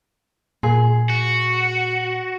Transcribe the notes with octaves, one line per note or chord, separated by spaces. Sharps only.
A#2 G#4
F#4